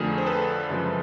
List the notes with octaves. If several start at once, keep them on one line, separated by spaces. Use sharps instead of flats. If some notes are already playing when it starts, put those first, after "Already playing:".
Already playing: F2 D3 F3 A3 G#4 A#4
C5
A4 B4
F#2 C#3 F3 G#3